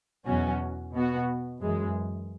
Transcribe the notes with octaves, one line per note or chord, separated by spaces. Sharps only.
E2 B2 F#3 C#4 F#4
B2 B3 F#4
F#2 E3 G#3